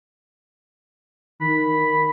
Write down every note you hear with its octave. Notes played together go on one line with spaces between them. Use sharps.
D#3 B5